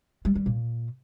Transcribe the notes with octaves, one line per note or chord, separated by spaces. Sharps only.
G3
G3
A#2